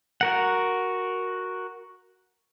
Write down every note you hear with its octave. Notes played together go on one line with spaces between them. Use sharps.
F#4 A#4 F#5